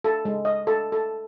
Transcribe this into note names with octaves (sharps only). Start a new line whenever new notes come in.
A4
G#3
D#5
A4
A4